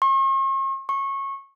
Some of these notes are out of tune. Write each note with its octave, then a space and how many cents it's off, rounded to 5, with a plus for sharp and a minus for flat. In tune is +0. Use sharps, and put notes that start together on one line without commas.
C#6 -45
C#6 -20